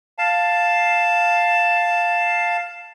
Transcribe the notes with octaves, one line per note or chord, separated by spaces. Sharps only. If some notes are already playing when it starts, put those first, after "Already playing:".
F5 A5